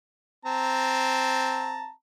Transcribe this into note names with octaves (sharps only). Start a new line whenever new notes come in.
C4 A5 A#5